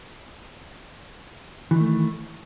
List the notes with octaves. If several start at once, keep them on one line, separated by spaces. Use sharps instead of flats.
D#3 E3 A3